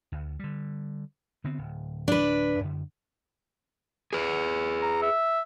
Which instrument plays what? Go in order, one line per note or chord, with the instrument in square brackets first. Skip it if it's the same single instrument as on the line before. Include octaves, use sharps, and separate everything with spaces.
[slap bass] D2
D3 G3
D3 B3 C4
D1
[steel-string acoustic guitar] D4 B4
[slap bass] F#2 D3
[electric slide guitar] G#4 B4
[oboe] A#5
E5